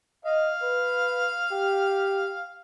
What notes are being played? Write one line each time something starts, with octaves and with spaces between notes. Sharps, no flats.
D#5 F5
B4
G4